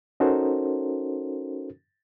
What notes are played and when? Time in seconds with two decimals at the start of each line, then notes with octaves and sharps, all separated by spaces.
0.20 C#4 D#4 F#4 A4 A#4 C5